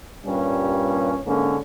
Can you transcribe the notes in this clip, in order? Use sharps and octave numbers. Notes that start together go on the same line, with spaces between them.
G2 A#2 G3 C#4
G#2 D3 A#3 C#4